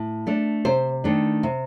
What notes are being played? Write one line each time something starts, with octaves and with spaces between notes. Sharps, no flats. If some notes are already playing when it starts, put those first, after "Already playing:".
Already playing: A2
A3 D4
C3 C5
D#3 A3 D4
C3